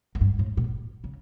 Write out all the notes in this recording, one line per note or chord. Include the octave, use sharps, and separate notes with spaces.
F#2
G2
A2
A#2
C#3